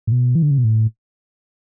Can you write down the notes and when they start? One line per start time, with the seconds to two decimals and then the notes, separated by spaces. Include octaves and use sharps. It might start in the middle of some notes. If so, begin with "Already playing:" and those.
0.07 A2
0.12 B2
0.35 E3
0.42 D3
0.51 C#3
0.58 B2
0.64 A2